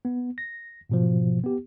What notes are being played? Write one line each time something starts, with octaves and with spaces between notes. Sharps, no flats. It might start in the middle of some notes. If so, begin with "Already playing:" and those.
B3
A#6
G#2 B2 F3
B3 G4